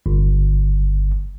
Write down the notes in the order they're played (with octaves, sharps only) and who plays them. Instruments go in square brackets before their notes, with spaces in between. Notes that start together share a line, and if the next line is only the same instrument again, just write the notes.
[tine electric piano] G1